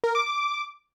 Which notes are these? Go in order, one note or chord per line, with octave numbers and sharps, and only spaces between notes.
A#4
D6
D6